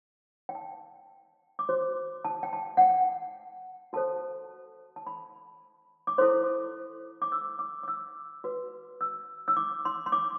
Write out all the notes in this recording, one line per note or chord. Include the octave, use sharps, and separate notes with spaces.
G5
A5
D6
F#4 C5 C6
A5
G5
A5
F#5
G5
F#4 A4 C5 A5
A5
B5
D6
E4 A4 C5 C6
D6
E6
D6
D6
E6
F#4 B4
E6
E6
D6
C6
C6
D6